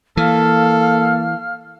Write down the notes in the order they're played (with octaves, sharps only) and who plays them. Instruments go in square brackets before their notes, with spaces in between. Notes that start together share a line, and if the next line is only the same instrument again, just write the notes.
[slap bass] E3 [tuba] A#3 [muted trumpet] A4 [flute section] F5 F6